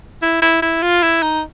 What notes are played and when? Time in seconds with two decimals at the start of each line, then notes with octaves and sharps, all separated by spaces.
0.22 E4
0.42 E4
0.62 E4
0.82 F4
1.03 E4
1.22 D#4